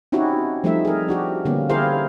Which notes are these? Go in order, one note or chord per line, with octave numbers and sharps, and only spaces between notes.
C4 C#4 D#4 E4 F#4 G4
F3 G3 A3 C4 D#4 E5
G#4 A#4
D4 F#4 G4
D3 G3 A#3 B3 C#4
E4 G4 G#4 A#4 C5 F5